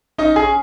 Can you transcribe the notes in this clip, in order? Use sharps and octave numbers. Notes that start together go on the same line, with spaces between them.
C#4 D#4 D#5
G#4 G#5
C#4